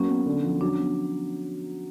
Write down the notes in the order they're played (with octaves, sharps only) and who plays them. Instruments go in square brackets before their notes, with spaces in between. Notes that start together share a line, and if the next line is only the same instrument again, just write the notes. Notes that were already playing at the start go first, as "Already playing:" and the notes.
Already playing: [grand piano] F#3 A#3 [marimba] C#4
[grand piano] B3
D3
F3
[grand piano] F#3 [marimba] D4
[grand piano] B3